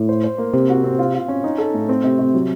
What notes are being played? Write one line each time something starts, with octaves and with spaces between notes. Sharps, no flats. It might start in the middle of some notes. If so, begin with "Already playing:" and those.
Already playing: A2
C5
C5
A#3
C3 C4
F#4
C4
F4
F4
C#4
D#4
A4
A2
C4
C3
C3
F#3